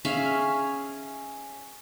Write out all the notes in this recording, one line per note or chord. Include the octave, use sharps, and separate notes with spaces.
C#4 G#4 E5 F5